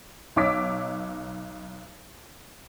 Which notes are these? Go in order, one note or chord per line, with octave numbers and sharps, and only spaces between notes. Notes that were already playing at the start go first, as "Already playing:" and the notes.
B1 D#4 C#5 D6 E6 B6